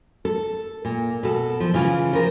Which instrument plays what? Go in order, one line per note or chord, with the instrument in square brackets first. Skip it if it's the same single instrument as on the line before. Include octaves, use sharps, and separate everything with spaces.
[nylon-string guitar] A4
A#2
B2 A4
F3
C#3 E3 F4
F3 A#4